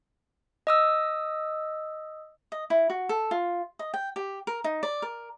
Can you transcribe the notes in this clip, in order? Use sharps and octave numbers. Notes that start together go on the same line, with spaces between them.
D#5 D#6 E6
D#5
E4
F#4
A4
F4
D#5
G5
G4
A#4
D#4
D5
A#4